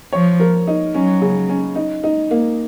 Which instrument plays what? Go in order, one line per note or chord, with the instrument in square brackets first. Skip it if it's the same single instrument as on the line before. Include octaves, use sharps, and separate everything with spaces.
[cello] F3 [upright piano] C#5
[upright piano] A#4
D#4
[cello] F#3 [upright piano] C#4
[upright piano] C#3
C#4
D#4
D#4
A#3